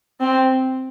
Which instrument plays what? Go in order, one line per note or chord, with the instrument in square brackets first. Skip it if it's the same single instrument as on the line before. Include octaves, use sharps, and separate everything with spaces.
[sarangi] C4